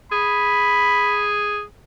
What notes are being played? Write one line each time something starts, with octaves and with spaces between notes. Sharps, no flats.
G#4 B5